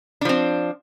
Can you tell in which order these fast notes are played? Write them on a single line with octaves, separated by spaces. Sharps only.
D4 F3 C4